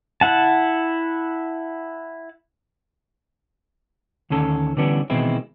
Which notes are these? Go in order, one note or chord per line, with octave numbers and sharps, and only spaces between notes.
E4 F#5 A5
D2 D#3 C#4 A4
D3 E3 G3 B3 C#4 D4
B2 D#3 E3 G#3 C4 E4